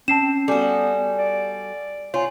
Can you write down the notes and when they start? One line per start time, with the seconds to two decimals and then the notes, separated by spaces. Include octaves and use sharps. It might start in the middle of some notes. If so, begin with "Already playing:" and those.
0.08 C4 C#4 A5 C7 E7
0.48 G3 B3 F#4 A4 G#5
1.18 D5
2.14 F4 C#5 G#5